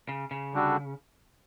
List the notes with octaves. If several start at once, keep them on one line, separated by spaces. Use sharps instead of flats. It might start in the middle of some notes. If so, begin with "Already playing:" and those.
C#3
C#3
D3 G3 D4 F#4 A4